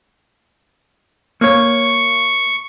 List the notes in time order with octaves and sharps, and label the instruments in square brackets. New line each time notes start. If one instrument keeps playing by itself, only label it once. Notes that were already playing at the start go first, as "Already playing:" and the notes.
[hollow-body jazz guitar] A#3 C#5 [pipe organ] C#6